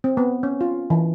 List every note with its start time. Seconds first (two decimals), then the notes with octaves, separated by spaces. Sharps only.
0.04 C4
0.17 B3
0.43 C#4
0.61 F4
0.90 E3